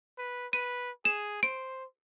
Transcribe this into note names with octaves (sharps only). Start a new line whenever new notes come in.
B4
B4 D#7
G#4 E7
C5 D7